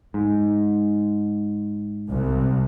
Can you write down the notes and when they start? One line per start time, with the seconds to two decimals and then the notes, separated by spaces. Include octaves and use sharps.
0.14 G#2
2.10 C2